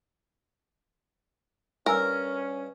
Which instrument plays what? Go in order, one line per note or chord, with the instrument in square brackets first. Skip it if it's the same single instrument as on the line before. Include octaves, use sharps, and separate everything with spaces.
[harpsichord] G2 [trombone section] C#4 [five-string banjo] A#4 [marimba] G#5 E6